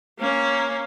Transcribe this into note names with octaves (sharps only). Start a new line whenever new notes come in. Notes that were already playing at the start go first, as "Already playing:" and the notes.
A#3 C#4